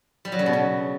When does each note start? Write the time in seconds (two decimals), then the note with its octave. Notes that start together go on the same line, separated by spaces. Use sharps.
0.25 G3
0.32 F#3
0.39 C#3
0.46 B2
0.53 C#3